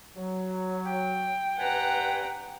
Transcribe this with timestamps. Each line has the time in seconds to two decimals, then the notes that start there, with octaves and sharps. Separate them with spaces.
0.17 F#3
0.86 G5
1.58 G2 B4 F#5 G#5 A#5